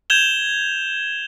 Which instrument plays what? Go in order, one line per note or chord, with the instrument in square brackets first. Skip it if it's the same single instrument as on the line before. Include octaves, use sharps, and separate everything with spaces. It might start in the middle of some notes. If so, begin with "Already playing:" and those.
[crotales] G6 G#6 E7 F7 G7